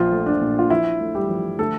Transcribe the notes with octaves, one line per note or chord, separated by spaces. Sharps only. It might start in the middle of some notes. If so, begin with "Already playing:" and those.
Already playing: A#1 F3 F4
A3
D4
A#2
F4
F3 E4
A3
G3 G4
F3
D3 A3 A4